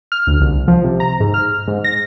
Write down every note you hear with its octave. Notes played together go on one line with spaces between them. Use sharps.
F6
D2
C2
F3
C3
A#5
G#2
F6
G#2
A#6